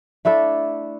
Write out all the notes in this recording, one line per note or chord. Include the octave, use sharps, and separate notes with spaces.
A3 D4 E4 A4